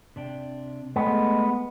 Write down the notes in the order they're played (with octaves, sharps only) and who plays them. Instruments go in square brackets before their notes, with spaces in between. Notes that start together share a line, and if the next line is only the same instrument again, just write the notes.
[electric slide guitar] C3 D4 G5
[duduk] G#3 [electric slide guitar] A3 [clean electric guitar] B3